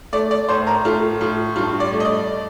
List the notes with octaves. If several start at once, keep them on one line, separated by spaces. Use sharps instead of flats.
A3 D5
D5
A2 C5
A#4
A3 F4
A2 F4
G2 F4
D5
A3
D#5
D5